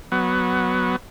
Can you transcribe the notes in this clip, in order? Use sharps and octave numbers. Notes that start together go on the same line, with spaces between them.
F#3 B3